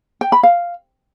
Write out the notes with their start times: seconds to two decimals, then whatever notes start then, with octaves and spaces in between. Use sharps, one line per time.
0.21 G5
0.32 B5
0.43 F5